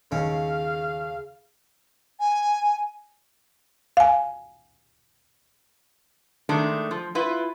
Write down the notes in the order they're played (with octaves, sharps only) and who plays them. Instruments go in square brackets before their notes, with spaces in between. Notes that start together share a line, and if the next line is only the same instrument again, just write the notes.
[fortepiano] D#2 [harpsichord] C#3 [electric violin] F5
[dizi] G#5
[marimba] F5 G#5
[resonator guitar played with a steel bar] D#3 G#3 A3 D4
F3
E4 F4 B4